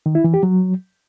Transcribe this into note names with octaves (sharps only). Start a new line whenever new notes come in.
D#3
E4
E3
G4
F#3